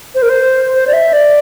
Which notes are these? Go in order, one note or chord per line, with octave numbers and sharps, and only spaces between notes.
C5
A#4
C5
C5
D5
E5
D5